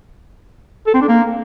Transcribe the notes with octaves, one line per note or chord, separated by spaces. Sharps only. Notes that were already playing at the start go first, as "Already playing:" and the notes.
A4
C4
D4
A#3